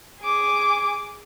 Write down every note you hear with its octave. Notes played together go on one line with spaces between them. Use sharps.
G#4 D6